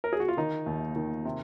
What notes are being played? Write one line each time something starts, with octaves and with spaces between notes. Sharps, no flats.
A#4
G#4
F#4
F4
D#3 D#4
D#2
D#3
C3